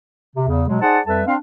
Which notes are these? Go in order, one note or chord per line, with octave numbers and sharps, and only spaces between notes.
C3
E2 C#3
B2 F#3 G#3
D#4 G#4 C5 D5 F#5 A5
F2 G3 A4 B4 E5 A5
C4 D4 F5